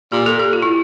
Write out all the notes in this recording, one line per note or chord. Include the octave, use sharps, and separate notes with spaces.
A#2 G4
A4
G4
F4
E4